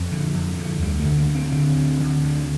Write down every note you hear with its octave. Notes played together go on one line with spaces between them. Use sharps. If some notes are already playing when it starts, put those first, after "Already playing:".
Already playing: F2 F3
D3
F2
D3
D2 G3
A3
D3
A#3
D2
C4
D3 C4
D2
D3
D2